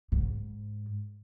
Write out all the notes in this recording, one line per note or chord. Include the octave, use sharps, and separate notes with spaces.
G#2